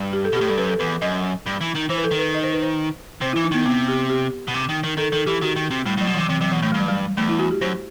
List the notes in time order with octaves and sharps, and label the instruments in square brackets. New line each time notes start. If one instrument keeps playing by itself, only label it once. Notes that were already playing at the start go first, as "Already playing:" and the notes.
Already playing: [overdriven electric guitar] G2
[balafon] G4
A4
[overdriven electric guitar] B2
[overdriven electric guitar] A2 [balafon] G4
[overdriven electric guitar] G2 [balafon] A4
[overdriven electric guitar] F#2 [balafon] B4
[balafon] A4
[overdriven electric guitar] E2 [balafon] B4
[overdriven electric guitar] F#2 [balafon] D#5
[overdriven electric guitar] G2
E3
D#3
[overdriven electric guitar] E3 [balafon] C5
[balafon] B4
A4
[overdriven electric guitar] D#3
[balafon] B4
D#5
C5
B4
C5
[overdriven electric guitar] C3 [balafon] C5
[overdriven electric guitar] E3 [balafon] E4
[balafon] D#4
[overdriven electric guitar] D#3 [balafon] B3
[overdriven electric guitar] C3 [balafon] B3
[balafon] G4
G4
[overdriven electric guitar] B2
C3
D#3
D#3
[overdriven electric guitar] D#3 [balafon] A4
[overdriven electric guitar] D#3 [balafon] A4
[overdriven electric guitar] E3 [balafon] G4
[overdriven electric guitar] D#3 [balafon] F#4
[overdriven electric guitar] D#3
C3
[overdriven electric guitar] A2 [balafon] G3
[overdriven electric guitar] A2 [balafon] F#3
[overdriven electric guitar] B2
[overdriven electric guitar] C3 [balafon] E3
[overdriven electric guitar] C3 [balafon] E3
[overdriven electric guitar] C3 [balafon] F#3
[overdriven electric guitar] B2 [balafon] E3
[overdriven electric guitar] A2 [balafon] A3
[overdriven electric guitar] G2 [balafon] G3
[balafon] F#3
G3
[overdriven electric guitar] E2 [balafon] A3
[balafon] E4
F#4
G4
[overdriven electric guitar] F#2 [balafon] C5